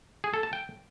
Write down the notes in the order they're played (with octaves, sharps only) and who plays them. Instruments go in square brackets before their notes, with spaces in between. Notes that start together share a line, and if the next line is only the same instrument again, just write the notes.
[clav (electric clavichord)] G#4
A4
A5
G5